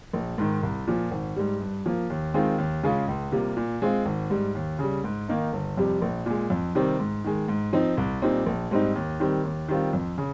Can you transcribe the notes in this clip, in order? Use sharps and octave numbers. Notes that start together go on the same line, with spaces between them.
A#1
G#2 D#3
C2
A#2 F3
G#1
G#2 G3
G2
F3 A#3
D#2
D#3 G#3 C4 F4
D#2
C#3 G#3 C#4 F4
C#2
C3 G3 A#3 F4
A#2
G#3 C4 F4
G#1
G#2 G3
D#2
C#3 G3
G#2
D#3 A#3 D#4
G1
F2 C3 G3
A#1
A#2 G#3
F2
C3 D#3 G3 C4
G#2
D#3 G#3
G#2
F3 C4 D#4
C2
A#2 G3 C4 D#4
A#1
G#2 G3 C4 D#4
D#2
D#3 G3 C4
D#2
D#3 G3 C4 F4
F2
C#3